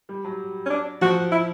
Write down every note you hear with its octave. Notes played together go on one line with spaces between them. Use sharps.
G3
F#3
C#4
D4
F3 F#4
E4